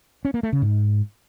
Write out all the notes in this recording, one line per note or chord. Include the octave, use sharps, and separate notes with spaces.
C#4
A#3
A3
C#3
G#2